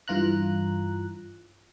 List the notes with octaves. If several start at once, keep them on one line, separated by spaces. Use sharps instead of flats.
G2 E3 F4 A#5 F#6